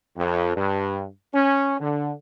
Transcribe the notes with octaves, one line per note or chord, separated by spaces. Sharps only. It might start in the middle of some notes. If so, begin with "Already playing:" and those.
F2
G2
C#4
D3